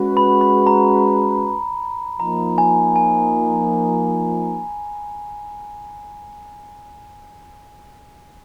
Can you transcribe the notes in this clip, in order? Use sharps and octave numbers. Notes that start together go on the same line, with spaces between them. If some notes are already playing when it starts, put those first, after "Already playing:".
Already playing: G#3 C#4 F#4 B4
B5
B5
A#5
F3 A#3 D#4 A#5
G#5
G#5